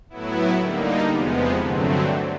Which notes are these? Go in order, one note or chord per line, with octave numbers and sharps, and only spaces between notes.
A2 F#3 B3 E4
D3 G3 A#3 D#4
E2 C3 F3 G#3 B3
G2 D3 F#3 A3 C4